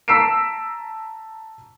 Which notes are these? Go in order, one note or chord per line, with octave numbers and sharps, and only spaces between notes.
A5 A#5 E6 B6 C7 D7